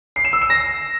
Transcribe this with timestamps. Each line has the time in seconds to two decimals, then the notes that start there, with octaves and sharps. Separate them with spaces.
0.16 C7
0.25 E7
0.33 E6
0.41 E7
0.50 A#6